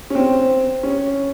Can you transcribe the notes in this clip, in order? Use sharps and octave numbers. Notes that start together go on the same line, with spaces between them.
C#4
C4
C#4